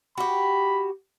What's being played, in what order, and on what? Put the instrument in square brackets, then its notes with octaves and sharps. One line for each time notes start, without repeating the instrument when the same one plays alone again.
[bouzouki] F#4 G4 [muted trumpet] B5